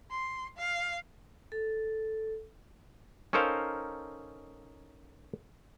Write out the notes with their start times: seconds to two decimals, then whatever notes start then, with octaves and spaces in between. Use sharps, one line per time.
0.11 C6
0.57 F5
1.52 A4
3.33 C#4 D#4 A4 A#4 C5 F5